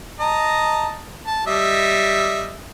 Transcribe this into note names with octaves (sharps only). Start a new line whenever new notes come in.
D#5 A5 A#5
A5
G3 D#5 E5